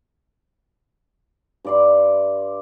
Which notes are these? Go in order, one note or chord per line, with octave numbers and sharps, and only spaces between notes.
G2 D5 C6